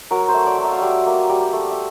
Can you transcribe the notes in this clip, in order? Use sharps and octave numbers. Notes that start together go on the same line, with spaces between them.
F#3 A#4
C5
A3
D5
F#3
E5
F5
G3 E5
A#3
G3
A3
E5